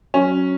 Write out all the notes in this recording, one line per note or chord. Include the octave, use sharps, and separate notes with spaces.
F#3 C#4